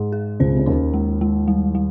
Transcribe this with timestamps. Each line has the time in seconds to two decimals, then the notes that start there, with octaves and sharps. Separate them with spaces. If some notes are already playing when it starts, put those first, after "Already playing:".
Already playing: G#2 G#3
0.12 G#4
0.40 C#2 C#3 C5
0.52 C3
0.59 C#3
0.66 D#2 D#3 C#4
0.94 G#3
1.21 G#3
1.48 G3
1.75 G3